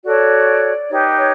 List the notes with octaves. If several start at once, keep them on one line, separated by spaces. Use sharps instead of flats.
F#4 A4 C#5 D5
D#4 G4 B4 C#5
C#5